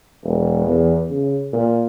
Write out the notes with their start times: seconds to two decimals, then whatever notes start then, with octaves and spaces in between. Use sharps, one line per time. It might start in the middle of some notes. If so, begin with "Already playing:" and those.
0.23 E1
0.66 E2
1.10 C#3
1.53 A#2